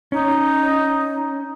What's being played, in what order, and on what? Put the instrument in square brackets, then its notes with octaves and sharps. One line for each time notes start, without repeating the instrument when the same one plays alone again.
[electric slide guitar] C#4 [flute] D#4